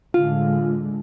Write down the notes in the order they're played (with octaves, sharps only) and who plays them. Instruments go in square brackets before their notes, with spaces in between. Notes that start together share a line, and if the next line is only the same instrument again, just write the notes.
[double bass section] A2 D3 G#3 [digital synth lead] F4